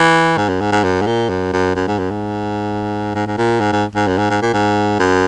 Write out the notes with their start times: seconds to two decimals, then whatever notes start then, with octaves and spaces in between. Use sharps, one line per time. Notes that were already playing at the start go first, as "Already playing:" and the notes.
Already playing: E3
0.37 G#2
0.49 F#2
0.61 G#2
0.72 G#2
0.84 F#2
1.01 G#2
1.07 A#2
1.29 F#2
1.53 F#2
1.76 F#2
1.88 G#2
1.99 F#2
2.10 G#2
3.15 G#2
3.27 G#2
3.38 A#2
3.60 G#2
3.72 G#2
3.95 G#2
4.07 F#2
4.18 G#2
4.30 G#2
4.42 A#2
4.53 G#2
4.99 F#2